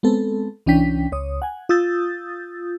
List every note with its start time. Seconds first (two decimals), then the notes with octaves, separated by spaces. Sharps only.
0.03 G#3 B3 C4 A4
0.66 C2 E3 C#4 D4 G5 B6
1.12 C#2 C#5 D#6
1.42 F#5 G#5
1.69 F4 D#6 E6 G6 A6